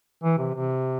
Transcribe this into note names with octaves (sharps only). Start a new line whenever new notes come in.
E3
C3
C3